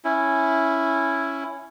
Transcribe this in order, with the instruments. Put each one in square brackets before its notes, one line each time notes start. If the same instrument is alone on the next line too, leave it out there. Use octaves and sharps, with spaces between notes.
[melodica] C#4 E4